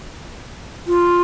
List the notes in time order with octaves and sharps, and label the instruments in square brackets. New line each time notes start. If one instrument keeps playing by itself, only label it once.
[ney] F4